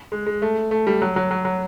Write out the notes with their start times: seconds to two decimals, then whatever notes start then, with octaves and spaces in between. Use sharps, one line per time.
0.12 G#3
0.26 G#3
0.42 A3
0.71 A3
0.87 G3
1.02 F#3
1.16 F#3
1.31 F#3
1.45 F#3